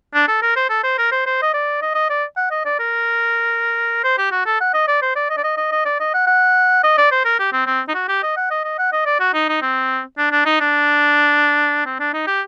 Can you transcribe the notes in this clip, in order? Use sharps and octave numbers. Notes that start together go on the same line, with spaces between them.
D4
A4
A#4
C5
A4
C5
A#4
C5
C5
D#5
D5
D#5
D#5
D5
F#5
D#5
D5
A#4
C5
G4
F#4
A4
F#5
D#5
D5
C5
D5
D#5
D5
D#5
D#5
D#5
D5
D#5
F#5
F#5
D#5
D5
C5
A#4
G4
C4
C4
D#4
F#4
G4
D#5
F#5
D#5
D#5
F#5
D#5
D5
F#4
D#4
D#4
C4
D4
D4
D#4
D4
C4
D4
D#4
G4